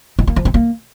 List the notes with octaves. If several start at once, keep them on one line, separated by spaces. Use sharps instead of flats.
D#4
A#3
F3
C4
A#3